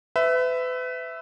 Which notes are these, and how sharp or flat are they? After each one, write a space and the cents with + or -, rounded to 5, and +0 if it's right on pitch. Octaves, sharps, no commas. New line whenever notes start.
B4 +35 E5 +0